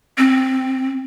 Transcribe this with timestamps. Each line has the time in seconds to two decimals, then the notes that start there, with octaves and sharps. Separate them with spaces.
0.18 C4